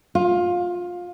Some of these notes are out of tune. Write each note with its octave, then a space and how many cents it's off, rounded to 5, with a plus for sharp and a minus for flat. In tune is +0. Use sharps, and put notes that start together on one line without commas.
F4 +20